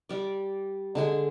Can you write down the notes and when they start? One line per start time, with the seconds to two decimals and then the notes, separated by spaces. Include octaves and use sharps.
0.09 G3 D5
0.95 D3 G#3 G#5